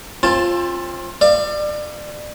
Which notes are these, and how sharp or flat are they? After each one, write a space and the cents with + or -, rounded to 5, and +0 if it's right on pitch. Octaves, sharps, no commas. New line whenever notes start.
C4 +35 F4 +0 A5 +0
D5 +30 F5 -45